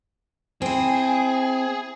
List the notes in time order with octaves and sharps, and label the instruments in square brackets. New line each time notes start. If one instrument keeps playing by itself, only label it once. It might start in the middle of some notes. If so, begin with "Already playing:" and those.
[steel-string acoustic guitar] C4 E4 [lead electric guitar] G#4